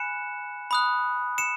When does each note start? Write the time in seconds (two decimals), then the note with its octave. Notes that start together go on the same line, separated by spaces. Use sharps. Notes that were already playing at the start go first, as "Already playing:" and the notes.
Already playing: G#5 B5 F#6 C#7 E7
0.71 B5 D#6 F#6
1.38 C#7 E7